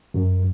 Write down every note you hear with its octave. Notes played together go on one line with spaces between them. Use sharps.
F#2